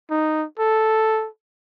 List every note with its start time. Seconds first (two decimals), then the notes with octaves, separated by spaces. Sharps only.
0.10 D#4
0.59 A4